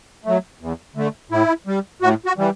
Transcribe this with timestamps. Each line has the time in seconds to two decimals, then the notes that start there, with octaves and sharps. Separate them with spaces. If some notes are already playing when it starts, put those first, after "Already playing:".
0.25 F#3 A3
0.61 E2
0.95 D3 A3
1.31 A2 E4
1.67 G3
2.02 A2 F#4
2.26 F#4
2.38 E3 G3